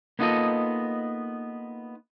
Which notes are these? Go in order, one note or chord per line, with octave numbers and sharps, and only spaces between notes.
A#3 B3 D#4 F4 A4 D#5